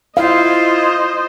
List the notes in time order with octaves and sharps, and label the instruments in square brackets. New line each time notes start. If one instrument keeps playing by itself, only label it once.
[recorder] E4 [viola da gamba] F4 [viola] C5 D#5 [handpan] F5